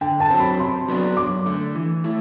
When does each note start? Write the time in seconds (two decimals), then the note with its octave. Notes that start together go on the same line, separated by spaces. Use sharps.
0.01 D3 G5
0.20 A5
0.30 F#3 C4
0.40 B5
0.59 C3 C6
0.88 F#3 B3 D4 F#4
1.17 F#2 D6
1.46 D3 A3
1.75 E3
2.04 A3 E4